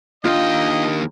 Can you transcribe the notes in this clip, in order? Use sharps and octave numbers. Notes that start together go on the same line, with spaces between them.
D#2 D4 F4 D#5 G5